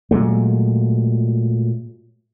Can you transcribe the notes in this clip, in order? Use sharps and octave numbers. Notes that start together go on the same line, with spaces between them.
A#2 F#3 G#3 A3